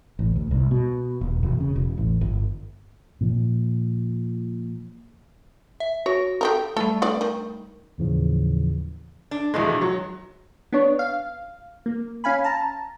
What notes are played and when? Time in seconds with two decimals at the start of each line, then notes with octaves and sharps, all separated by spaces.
0.19 A1
0.36 D2
0.51 C2
0.71 B2
1.21 D#1
1.43 E1
1.60 C#3
1.76 E1
1.98 A1
2.21 G1
3.21 A#2 F3
5.80 E5
6.06 F#4 C#5
6.41 G4 A4 A#4
6.77 G3 A3 A4
7.02 D3 B3 D5
7.21 D#3
7.98 D#2 A2 C#3 E3 F3
9.31 D4
9.54 A#1 E2 B2 D#3 G#3 A3
9.81 F#3
10.73 B3 D4 C#5
10.99 F5
11.86 A#3
12.24 C#4 F5 G#5 B5
12.44 A5 A#5